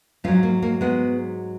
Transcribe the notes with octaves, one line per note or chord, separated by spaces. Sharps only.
G#2 F#3 C#4 F4
A#3
A#3
G#3 B3